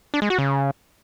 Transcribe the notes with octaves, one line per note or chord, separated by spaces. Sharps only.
D4
G#3
F#4
C#3